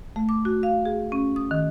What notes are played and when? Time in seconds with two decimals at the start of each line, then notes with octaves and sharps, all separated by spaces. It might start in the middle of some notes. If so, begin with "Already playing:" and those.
0.16 A3
0.29 D6
0.45 F#4
0.63 F5
0.85 G#4
1.12 C#4
1.36 D#6
1.51 D#3